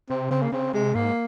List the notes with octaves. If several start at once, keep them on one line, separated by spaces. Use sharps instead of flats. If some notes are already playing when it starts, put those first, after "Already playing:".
C3 C4
C#3 C4
A#3
C#3 C4
C3 G#3
G#2 A#3